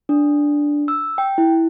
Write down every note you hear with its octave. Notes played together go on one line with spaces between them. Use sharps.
D4
E6
G5
E4